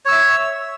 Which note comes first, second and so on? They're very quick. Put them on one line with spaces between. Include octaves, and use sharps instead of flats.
C#5 E6 E5